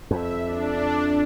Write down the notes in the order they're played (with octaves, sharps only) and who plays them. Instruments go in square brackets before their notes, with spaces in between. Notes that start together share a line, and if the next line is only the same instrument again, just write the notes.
[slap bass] F2 [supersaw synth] E5
[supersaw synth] D4